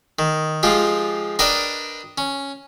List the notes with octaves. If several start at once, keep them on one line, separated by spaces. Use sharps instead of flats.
D#3
F3 G#3 F4 G4
D4 A#4 B4 D5 D#5 G5
C#4